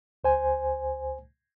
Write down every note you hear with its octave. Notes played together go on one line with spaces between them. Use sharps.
C#2 C5 G#5